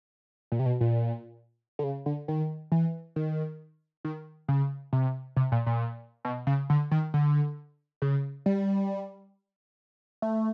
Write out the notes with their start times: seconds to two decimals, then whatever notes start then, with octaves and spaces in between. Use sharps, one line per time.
0.52 A#2
0.59 C3
0.66 B2
0.81 A#2
1.79 D3
1.84 C#3
2.06 D3
2.28 D#3
2.72 E3
3.16 D#3
4.05 D#3
4.48 C#3
4.93 C3
5.37 C3
5.52 A#2
5.66 A#2
6.25 B2
6.47 C#3
6.70 D3
6.91 D#3
7.14 D3
8.02 C#3
8.46 G3
10.22 A3